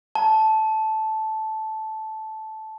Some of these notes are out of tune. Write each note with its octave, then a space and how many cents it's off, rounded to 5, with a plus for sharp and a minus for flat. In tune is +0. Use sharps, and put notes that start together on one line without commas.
A5 -10